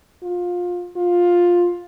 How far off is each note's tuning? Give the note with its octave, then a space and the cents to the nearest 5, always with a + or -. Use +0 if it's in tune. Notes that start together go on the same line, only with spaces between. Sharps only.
F4 +25
F4 +10